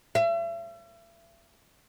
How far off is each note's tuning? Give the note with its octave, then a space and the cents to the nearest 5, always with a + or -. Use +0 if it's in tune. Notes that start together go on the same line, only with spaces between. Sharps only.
E5 +40